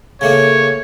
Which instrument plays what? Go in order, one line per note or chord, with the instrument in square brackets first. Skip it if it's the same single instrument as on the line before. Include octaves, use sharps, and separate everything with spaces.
[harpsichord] C#3 A3 A#3 [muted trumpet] C#5